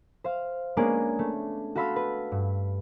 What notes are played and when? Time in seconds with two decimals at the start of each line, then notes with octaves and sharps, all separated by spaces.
0.24 C5 F5
0.77 G#3 A#3 B3 C#4 D4 G#4
1.19 A3
1.75 F#4 A4 F5 B5 C6 E6
1.96 B4
2.32 G2